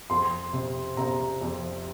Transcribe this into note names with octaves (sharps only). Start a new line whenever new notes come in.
F2 C6
C3
C3 A#5
F2